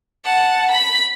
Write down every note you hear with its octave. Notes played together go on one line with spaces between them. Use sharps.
F#5 A5
B5 B6